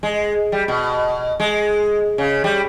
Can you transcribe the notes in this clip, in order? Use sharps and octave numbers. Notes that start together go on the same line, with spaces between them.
G#3
G3
B2
G#3
C#3
G3